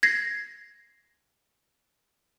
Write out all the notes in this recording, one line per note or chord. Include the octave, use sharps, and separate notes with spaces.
G#6 A#6 C7